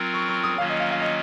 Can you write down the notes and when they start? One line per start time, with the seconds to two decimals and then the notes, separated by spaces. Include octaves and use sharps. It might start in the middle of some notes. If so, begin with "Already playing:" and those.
Already playing: F#3 C4 F4 A#4
0.14 C#6
0.28 C#6
0.43 D#6
0.58 D#3 F#3 A#3 C#4 F4 F5
0.69 D#5
0.80 F5
0.91 F5
1.01 D#5